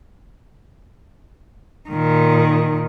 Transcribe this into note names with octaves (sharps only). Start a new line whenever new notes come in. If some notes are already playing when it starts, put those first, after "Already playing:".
A#2 D#3